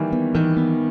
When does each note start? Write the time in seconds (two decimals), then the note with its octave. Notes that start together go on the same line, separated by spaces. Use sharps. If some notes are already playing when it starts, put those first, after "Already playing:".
Already playing: D#3 E3 G3 A#3
0.13 B3
0.34 D#3 E3
0.57 B3